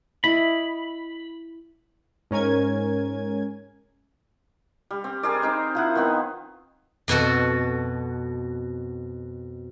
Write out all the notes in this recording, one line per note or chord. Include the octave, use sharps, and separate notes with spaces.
E4 D#5 B5
G#2 C#4 A#4 G#5 G#6
G3
C4
C4 G#4 A#4 D5
C4 D#4 C5
F3 E4 F#5
D#3 F3 B3 C4
F2 B2 F#4 A4